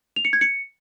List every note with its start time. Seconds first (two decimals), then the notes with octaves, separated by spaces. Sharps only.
0.16 F7
0.25 C#7
0.33 G#6
0.41 C#7